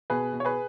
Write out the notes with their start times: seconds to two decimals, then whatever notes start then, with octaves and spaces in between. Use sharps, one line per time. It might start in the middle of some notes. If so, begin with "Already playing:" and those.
0.10 B2 G#4 B4
0.33 B2
0.40 C#5
0.45 G#4 B4